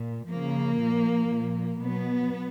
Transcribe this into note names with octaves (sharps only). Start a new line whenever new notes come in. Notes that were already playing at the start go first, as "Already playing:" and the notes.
Already playing: A#2
C#3 F3 A#3
A#2 F3
A#2 F3
B2 F#3 B3